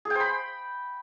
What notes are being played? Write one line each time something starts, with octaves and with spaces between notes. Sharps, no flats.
G#4
G5
C5
B5